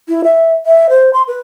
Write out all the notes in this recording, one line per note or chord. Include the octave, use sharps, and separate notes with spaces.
E4
E5
E5
C5
C6
B4